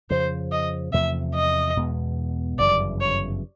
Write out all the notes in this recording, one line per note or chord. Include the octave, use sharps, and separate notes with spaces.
F2 C#3 F3 C5
D#5
E2 C3 F3 A3 E5
D#5
E2 B2 G#3 B3
G1 F#2 C#3 E3 D5
C#5